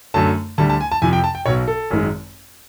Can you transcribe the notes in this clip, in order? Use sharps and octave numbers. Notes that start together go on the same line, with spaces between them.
F#2 D3 F#3 A3 A5
D2 D3 G3 A5
A5
G#5
A5
F2 C3 F3 G#5
G5
A5
G5
B1 B2 F#3 C#5
A4
G#1 F#2 D#3 G#3